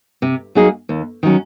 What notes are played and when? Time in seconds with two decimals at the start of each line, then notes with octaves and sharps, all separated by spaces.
0.22 C3
0.55 F#3 A#3 D#4 G#4
0.89 D#2
1.23 D#3 F#3 C#4